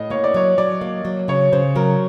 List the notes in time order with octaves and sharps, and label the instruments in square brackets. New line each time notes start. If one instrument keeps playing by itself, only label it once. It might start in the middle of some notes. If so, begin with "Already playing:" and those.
Already playing: [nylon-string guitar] A2 [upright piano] D#5
[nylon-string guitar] A#3 [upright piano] C#5
[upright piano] D5
[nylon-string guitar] F#3 [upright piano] C#5
[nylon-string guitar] F#3 [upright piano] D5
[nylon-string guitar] A#3
F#3
[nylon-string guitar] C#3 [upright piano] C#5
[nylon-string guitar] C#3 [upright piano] C5
[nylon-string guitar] F#3 [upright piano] A#4